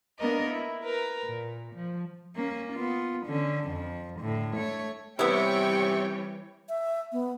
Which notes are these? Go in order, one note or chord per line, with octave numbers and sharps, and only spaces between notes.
A#3 B3 D4 A#4 D#5
E4
A#4 B4 A#5
A#2
F3
A#3 C#4
B3 F4
D3 C#4
F2 F3
A2 D3
A3 C#5
C3 E3 G3 B3 E4 C#5 G5 C#6
E5
B3